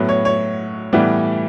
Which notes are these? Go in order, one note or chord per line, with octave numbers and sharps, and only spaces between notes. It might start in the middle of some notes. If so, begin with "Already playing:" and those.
Already playing: A2 F#3 B3
C#5
C#5
A2 E3 G3 B3